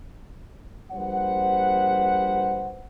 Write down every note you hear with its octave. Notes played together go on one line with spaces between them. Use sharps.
A#1 G3 B4 C5 F#5